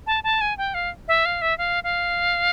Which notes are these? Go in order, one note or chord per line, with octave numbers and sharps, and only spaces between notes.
A5
A5
G#5
G5
F5
E5
F5
E5
F5
F5